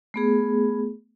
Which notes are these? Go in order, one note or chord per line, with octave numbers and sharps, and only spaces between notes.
A3 B3 G#4